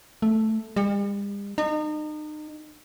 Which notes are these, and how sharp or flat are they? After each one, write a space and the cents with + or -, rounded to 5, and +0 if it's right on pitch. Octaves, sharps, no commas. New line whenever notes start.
A3 +0
G3 +45
D#4 -35